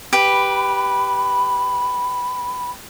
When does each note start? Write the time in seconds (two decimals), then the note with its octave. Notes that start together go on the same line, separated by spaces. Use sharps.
0.13 G4 B4 B5